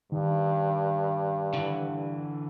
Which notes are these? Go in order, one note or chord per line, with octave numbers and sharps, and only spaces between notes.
G2 D#3
D3 E3